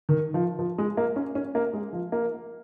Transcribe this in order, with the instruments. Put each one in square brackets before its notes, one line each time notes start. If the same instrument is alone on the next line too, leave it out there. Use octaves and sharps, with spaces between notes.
[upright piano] D#3
F3
F3
G#3
A#3
C#4
C#4
A#3
G#3
F3
A#3